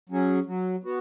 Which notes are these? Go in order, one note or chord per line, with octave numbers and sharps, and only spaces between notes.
F#3 C#4 G#4
F#3
B3 F#4